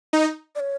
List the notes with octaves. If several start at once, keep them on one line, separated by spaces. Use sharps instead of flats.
D#4
D5
C#5